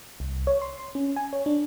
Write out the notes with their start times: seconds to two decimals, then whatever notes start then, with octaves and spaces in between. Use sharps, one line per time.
0.20 C2
0.47 C#5
0.62 C6
0.95 C#4
1.16 G#5
1.33 C#5
1.46 D4